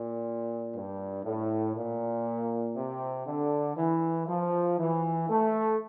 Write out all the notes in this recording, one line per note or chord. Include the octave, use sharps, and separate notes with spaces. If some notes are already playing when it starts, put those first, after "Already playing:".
Already playing: A#2
G2
A2
A#2
C3
D3
E3
F3
E3
A3